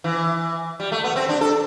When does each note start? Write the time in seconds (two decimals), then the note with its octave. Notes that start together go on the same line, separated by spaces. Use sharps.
0.04 E3
0.80 G3
0.92 A3
1.04 B3
1.16 C4
1.29 D4
1.41 A4